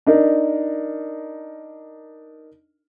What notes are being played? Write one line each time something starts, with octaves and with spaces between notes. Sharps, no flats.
D4 D#4 A#4